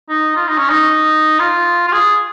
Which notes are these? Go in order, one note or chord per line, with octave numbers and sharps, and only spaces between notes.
D#4
F4
D#4
C#4
D#4
F4
F4
G#4